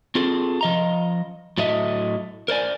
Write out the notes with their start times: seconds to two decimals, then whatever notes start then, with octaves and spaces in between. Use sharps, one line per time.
0.15 C4 F4 G#4 A4
0.61 F3 D#5 A#5
1.58 A2 F#3 A3 D#5 E5
2.48 A#4 C5 D5 G#5